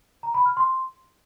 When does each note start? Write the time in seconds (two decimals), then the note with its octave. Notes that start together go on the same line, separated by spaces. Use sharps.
0.23 A#5
0.34 B5
0.46 F6
0.57 C6